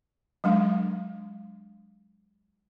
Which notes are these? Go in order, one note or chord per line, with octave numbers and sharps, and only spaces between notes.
F#3 G#3 D4 F5